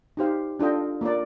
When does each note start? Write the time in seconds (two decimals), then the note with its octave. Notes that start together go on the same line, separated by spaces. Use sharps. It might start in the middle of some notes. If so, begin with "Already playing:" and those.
0.17 D#4 G4 C5 F5
0.59 D4 F4 A4 D#5 G5
1.01 A#3 F4 A#4 D5